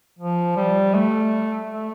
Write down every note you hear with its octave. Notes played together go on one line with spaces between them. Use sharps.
F3
G3
A3
A3